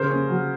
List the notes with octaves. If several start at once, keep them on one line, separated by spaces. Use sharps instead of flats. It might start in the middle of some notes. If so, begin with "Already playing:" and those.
Already playing: C#3 A#4 C5
C#4
F#3